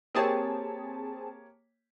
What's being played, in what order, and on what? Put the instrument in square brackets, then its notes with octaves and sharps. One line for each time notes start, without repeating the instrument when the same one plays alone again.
[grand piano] A#3 G4 C#5 [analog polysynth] C4 G#4 A5